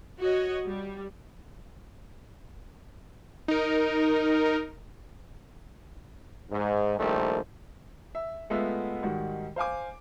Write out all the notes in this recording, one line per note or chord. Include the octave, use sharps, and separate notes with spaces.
F#4 C#5 D#5
G3
D#4 A#4
G#2
A#1 D#3 G3 A3 C5
E5
G#3 A3 B3 F4 E5
G#2 D#3 G3 F#4
C5 F5 G#5 D6